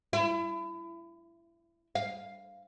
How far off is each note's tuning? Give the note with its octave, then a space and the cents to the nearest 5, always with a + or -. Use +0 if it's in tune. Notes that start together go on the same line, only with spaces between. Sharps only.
E4 +30
F5 +0